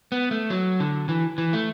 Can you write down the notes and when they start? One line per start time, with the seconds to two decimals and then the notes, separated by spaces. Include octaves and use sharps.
0.12 B3
0.31 A3
0.50 F#3
0.80 D3
1.09 E3
1.38 E3
1.53 A3